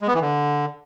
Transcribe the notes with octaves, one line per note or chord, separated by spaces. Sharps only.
G#3
B3
E3
D3